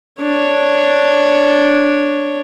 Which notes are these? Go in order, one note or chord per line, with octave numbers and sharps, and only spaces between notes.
D4 C#5